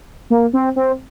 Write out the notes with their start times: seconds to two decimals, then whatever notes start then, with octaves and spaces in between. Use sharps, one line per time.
0.30 A#3
0.53 C4
0.76 C4